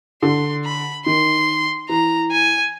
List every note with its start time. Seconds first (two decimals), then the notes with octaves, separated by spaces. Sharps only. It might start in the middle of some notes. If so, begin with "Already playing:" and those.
0.22 D3 C6
0.64 B5
1.06 D#3 C6
1.89 E3 A#5
2.31 G#5